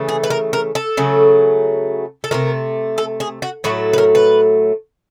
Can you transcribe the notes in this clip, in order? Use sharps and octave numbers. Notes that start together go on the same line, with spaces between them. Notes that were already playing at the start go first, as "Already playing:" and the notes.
Already playing: C#3 E3 A3
G#4
B4
A#4
A#4
A4
C#3 F#3 A3
A4
C3 F3 A3 A#4
A4
G#4
F#4
A2 F#3 A3 F#4
B4
A#4
B4